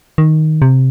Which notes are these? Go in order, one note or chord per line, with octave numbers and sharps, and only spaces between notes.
D#3
C3